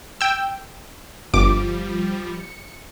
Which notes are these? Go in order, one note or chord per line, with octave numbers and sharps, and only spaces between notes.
G5 E6
G1 F3 G3 D6
C#7